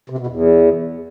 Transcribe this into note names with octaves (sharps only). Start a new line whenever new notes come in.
C3
B2
E2